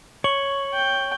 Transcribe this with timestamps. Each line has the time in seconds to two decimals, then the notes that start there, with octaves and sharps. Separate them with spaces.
0.24 C#5 C#6 F#7
0.74 G5